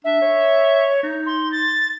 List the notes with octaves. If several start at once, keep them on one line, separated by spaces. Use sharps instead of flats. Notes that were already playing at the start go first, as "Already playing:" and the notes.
D4 E5
C#5
D#4
C6
A6